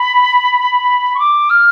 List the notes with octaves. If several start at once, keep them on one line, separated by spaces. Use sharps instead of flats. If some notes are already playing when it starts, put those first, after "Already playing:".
Already playing: B5
C#6
D6
F6